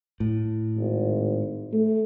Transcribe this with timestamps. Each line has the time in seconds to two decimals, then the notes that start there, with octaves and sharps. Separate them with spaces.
0.20 A2
0.76 G#1
1.72 A3